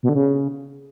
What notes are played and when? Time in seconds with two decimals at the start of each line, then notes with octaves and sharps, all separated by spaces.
0.03 B2
0.09 D3
0.15 C#3